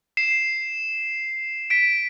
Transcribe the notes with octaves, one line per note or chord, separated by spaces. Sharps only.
C7 E7
B6 D7